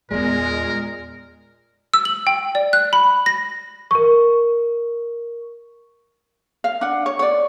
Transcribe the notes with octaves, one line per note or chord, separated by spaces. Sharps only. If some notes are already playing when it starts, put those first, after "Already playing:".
E2 A#2 G#3 F4 A#4
E6
F#7
G5
D5
F#6
B5
A#6
A#4 C#6
F5
D4 F#5
C#5
C#5 D5